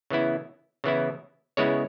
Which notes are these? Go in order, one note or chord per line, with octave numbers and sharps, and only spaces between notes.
C#3 E3 B3 E4
C#3 E3 B3 E4
C#3 G#3 B3 E4 C#5